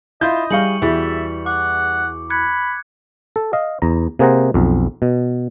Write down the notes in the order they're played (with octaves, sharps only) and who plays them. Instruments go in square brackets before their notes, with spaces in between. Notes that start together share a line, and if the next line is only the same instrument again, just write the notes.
[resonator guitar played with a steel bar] E4 F4 [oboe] D#5 [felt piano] G6
[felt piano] G3 F5 [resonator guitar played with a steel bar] G#4 [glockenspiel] C#6 C#7 F#7
[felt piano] E2 F#4 G#4 [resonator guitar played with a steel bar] E3 G3 [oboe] E5
[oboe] F#5 [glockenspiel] D6
[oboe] B5 [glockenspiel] F#6 G#6 C#7
[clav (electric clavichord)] A4
D#5 F5
E2 A#5
C3 A#3 G#4 C5 F#5 A#5
B1 F2
B2